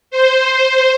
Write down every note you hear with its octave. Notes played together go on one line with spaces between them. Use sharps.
C5